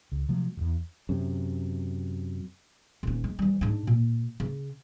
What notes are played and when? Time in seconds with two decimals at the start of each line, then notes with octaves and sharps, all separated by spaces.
0.12 C#2
0.29 C3 F3 F#3 A3
0.57 D#1 E2
1.09 F#2 C3
3.03 D#1 C#4
3.24 G#3
3.39 E3 G3
3.61 G#2 D4
3.87 A#2
4.40 C#3